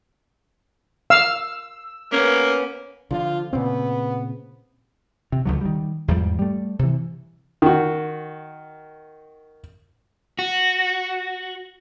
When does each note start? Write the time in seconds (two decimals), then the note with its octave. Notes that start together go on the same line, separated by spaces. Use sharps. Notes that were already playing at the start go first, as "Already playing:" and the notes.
1.10 F5 E6
2.12 A#3 B3 C#4
3.11 D3 E3 F3 F4
3.53 A#2 C#3 B3 C4
5.32 C3
5.45 C#2 D3 F#3
5.61 D#3 G3
6.08 E2 G#2 F3 G3
6.39 G3 A3
6.79 C3 E3
7.62 D#3 F#4
10.39 F#4